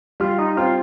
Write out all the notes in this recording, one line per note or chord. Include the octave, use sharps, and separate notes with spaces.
G3 F4
D#4
C4 F4